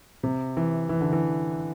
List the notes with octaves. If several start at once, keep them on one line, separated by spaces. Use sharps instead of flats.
C3
E3
E3
D3
E3